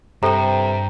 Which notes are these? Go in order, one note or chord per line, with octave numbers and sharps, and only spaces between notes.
G2 C3 G4 A4 C5 G5 A#5